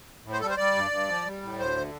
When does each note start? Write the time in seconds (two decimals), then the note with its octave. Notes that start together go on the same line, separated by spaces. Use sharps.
0.24 A2
0.33 C5
0.41 G3 A4
0.50 C5
0.57 G3 D5
0.75 G2
0.91 G2
1.09 F3
1.26 G3
1.42 A2
1.59 D2 C5
1.76 D3